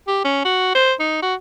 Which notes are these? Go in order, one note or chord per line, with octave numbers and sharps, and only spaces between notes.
G4
C#4
F#4
C5
D#4
F#4